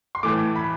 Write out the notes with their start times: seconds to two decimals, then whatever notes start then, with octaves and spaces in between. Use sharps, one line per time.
0.15 C6
0.23 A2 E3 A3 D6
0.55 B5